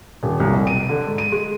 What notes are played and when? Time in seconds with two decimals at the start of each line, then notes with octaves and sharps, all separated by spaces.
0.23 D#1
0.40 C2
0.52 F1
0.67 D#7
0.89 D3
1.07 G#2
1.18 D#7
1.32 G#3